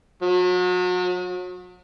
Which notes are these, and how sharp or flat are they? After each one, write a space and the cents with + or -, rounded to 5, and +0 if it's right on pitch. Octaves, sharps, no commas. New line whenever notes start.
F#3 -35